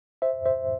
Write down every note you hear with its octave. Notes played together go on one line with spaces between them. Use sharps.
C5 E5
C5 E5